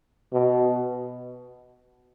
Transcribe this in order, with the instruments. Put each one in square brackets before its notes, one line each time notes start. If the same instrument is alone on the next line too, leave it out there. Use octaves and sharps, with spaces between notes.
[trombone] B2